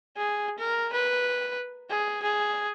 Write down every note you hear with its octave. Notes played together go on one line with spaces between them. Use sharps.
G#4
A#4
B4
G#4
G#4